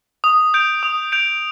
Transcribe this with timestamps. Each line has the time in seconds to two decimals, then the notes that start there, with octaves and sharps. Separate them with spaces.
0.24 D#6
0.54 G6 D7 F7
0.83 D#6
1.12 G6 D7 F7